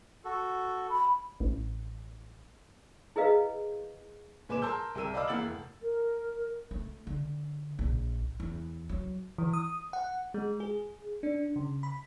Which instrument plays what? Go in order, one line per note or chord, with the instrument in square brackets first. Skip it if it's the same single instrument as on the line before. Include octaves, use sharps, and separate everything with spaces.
[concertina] F#4 A4
[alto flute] B5
[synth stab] A1
[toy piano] E4 G#4 A#4 B4 D#5 F5
[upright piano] A#2 B4 G#5 D6 E7
A#4 A5 C6 E6 G6
C2 G4 A#4 E6 D#7
D5 D#5 F5 B5 D6 E6
E3 A#3 F#5 E6 A6 F#7
F1
[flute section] A#4
[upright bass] A3
D3
A#1
E2
F#3
[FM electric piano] E3
D#6
F#5
G#3
G#4
D4
C#3
B5